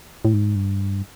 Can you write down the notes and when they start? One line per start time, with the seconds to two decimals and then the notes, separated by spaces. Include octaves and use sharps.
0.25 A2
0.34 G#2
0.55 G2